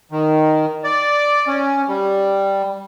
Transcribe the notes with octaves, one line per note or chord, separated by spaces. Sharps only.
D#3
D5
C#4
G3